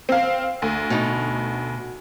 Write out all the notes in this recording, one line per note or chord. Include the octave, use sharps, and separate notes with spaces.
C4 F5
D2
B2 D#4